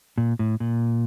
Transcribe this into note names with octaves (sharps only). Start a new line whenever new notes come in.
A#2
A2
A#2